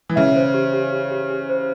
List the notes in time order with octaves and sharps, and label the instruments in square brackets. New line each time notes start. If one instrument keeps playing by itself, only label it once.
[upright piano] E3
[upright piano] C#3 [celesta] E5
[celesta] C5
G4
G4
G4
G4
G4
C5